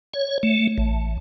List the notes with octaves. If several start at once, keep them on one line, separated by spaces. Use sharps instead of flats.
C#5
A3
A1